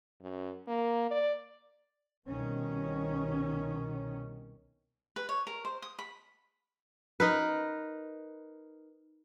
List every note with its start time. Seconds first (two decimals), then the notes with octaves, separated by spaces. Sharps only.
0.21 F#2
0.67 A#3
1.11 D5
2.26 C2 B2 D#3 C#4
5.16 B4
5.29 C#5
5.47 A#4
5.65 C5
5.82 D#6
5.99 B5
7.20 D#4 A#4 B4